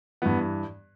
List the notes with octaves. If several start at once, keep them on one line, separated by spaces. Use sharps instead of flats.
G2 E3 B3